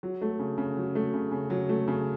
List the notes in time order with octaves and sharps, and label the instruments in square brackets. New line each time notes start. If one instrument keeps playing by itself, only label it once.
[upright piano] F#3
A3
C#3
C#3
F#3
A3
C#3
C#3
F#3
A3
C#3